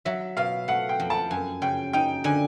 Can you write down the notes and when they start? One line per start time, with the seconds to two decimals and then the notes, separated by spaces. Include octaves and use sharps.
0.05 F#3 E5
0.37 B2 F5
0.68 A3 F#5
0.89 G5
1.00 F2
1.10 A5
1.31 F#2 G#5
1.62 C#3 G5
1.93 D#4 G5
2.24 D3 G#5